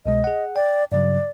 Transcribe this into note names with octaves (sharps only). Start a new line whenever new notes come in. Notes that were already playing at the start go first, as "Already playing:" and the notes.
C2 B2 G#3 D#5
G#4 F#5
D5 G5
G2 C#3 F#3 D5